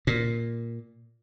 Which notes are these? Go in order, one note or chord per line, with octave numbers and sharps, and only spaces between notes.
A#2